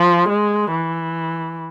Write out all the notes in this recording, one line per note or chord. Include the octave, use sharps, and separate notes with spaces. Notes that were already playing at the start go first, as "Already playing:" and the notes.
Already playing: F3
G#3
E3